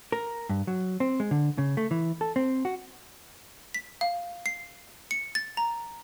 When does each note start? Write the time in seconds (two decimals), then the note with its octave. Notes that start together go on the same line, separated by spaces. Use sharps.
0.12 A#4
0.49 G2
0.67 F#3
1.00 C4
1.20 G#3
1.31 D3
1.58 C#3
1.77 A3
1.91 E3
2.21 A4
2.36 C4
2.65 F#4
3.74 B6
4.01 F5
4.46 C7
5.11 C#7
5.35 A6
5.57 A#5